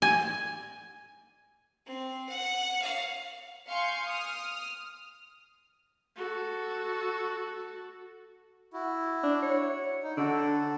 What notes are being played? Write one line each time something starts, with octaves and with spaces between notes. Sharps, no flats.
G#5
C4
F#5
F5
F5 G#5 C6 C#6 G6
D#6 F6
F#4 A4
E4 F#4
D4
C#5
D#4
D3 F#4 A4